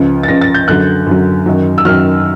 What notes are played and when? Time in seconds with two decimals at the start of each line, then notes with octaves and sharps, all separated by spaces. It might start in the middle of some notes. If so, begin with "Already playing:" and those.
Already playing: C#2 C#3 F3
0.23 A6
0.28 C#2 C#3 F3 A#6
0.41 A6
0.54 G6
0.68 F#2 D3 F#3 F#6
1.07 F#2 D3 F#3
1.46 F#2 D#3 F#3
1.78 E6
1.85 F#2 D#3 F#3 F6